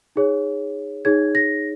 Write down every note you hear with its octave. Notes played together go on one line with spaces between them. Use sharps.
D#4 G#4 C#5
D#4 G#4 C#5 G#6
A#6